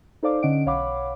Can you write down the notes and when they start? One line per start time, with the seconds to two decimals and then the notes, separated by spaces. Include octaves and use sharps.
0.23 D#4 A4 C5 D5 F5 D6
0.43 D3 C#4 D#5 F#5 D7
0.66 B1 C#5 F5 F#5 B5 D6